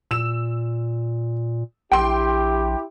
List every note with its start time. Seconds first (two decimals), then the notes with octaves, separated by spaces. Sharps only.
0.11 A#2 E6 E7
1.92 A#1 E4 G4 G5 C6